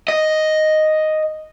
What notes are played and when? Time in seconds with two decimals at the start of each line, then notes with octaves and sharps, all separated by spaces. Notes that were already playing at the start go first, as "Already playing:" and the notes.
0.08 D#5